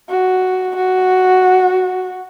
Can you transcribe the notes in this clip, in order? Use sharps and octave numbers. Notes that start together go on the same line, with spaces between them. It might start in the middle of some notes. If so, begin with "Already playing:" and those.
F#4
F#4